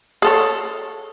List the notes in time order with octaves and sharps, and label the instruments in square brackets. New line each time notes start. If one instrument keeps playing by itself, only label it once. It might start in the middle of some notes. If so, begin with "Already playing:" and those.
[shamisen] G#4 A4 C#5